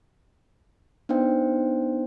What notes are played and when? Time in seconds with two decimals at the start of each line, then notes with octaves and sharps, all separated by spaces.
1.09 B3 D4 D#4 C5 G5